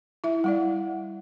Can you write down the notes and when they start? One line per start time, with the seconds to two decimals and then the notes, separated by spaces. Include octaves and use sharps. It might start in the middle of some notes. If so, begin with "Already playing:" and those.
0.24 E4 E5
0.44 G3 E4 D5 F#5